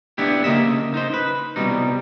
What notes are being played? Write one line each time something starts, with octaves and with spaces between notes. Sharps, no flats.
B3 D4 E4 G4
C#3 A#3 D#5 E5
D#4 C5
B4
C2 B2 G3 D#4